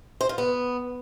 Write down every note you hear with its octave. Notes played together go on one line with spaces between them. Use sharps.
C5
F4
B3